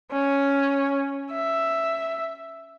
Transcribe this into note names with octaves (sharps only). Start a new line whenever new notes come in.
C#4
E5